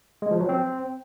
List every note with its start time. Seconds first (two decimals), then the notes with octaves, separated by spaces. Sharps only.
0.22 G#3
0.31 F3
0.40 F#3
0.49 C4